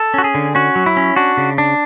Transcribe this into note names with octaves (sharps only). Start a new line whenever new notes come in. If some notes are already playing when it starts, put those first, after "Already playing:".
Already playing: A4
C#4 F#4
G#4
D3
C#4 F#4
F#3
E4
C#4
D4 F#4
C#3
D4